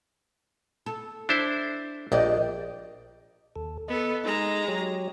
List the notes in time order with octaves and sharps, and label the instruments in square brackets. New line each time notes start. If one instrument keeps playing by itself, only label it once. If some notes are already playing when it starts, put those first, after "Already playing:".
[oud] A4
[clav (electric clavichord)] D4 E4 C5
[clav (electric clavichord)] A#1 [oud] G4 D5 D#5
[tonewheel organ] D#2 A4
[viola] B3 A4 [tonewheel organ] D#5
[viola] G#3 A#5 [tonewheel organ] D#4
[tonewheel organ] F#3 G4 C#5